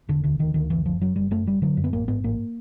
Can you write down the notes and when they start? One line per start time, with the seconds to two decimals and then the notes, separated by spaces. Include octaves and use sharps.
0.09 E1 D3
0.24 D2 D3
0.39 D2 D#3
0.54 D2 D#3
0.70 F#1 E3
0.85 F#1 F3
1.01 F#2 F#3
1.16 F#1 G3
1.31 F#2 A3
1.47 F#1 G3
1.62 D3 F#3
1.77 F#2
1.84 B3
1.93 A1 A#3
2.08 G#2 B3
2.24 A1 A#3